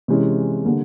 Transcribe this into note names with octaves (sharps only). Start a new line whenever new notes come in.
C3 E3 G#3 C#4
D3 G3 A#3